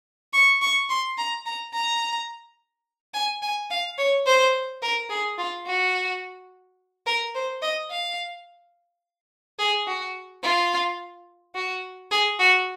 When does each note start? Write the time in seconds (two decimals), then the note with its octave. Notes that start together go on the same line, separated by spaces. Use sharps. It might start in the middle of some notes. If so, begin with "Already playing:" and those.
0.33 C#6
0.61 C#6
0.89 C6
1.18 A#5
1.46 A#5
1.74 A#5
3.14 G#5
3.42 G#5
3.70 F5
3.98 C#5
4.26 C5
4.82 A#4
5.10 G#4
5.38 F4
5.66 F#4
7.06 A#4
7.35 C5
7.62 D#5
7.91 F5
9.59 G#4
9.87 F#4
10.43 F4
11.55 F#4
12.11 G#4
12.39 F#4